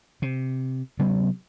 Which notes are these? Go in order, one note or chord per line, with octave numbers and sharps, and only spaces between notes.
C3
C3 F#3 B3 C#4